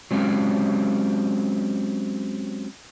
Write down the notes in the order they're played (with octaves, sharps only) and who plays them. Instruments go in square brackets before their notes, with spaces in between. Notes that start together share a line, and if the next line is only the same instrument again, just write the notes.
[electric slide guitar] F#3 G#3 C4 C#4 G4